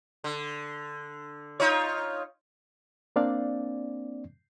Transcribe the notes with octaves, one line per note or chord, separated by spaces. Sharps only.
D3
D#4 F4 C#5
A#3 C4 D4 D5 F5